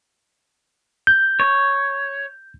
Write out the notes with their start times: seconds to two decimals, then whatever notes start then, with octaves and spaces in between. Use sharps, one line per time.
1.07 G6
1.40 C#5